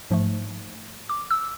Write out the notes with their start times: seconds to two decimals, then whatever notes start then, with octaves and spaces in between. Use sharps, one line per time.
0.10 G#2 F3 A3
1.09 D6
1.31 E6